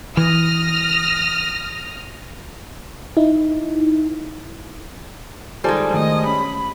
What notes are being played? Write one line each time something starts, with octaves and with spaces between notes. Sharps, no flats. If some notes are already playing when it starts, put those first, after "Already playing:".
E3 D#6 F6 A#6
D#4 E4
D#3 G3 G#3 F4 A4 C5 G#5 A5
D#3 A3 D#5 D#6
C#4 B5